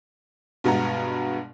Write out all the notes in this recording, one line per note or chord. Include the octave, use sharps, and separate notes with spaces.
G2 B2 G#3 B3 A#5